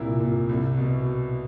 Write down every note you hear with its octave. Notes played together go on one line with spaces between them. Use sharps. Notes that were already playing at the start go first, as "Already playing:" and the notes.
Already playing: C2 A#2 E4 A#4
A#2
C2
B2